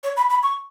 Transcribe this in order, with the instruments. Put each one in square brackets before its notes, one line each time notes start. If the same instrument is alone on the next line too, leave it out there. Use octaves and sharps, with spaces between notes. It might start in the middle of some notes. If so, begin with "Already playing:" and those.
[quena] C#5
B5
B5
C#6